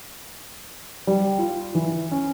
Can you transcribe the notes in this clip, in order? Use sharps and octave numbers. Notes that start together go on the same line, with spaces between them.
G3
F4
E3
C#4